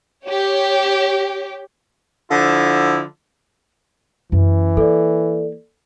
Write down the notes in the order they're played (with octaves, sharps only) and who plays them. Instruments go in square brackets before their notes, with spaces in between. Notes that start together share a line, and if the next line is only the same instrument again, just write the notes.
[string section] G4 C#5
[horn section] D3 F3 E4
[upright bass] F#2 C#4 [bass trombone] E3
[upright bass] A#3 [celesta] A4 D5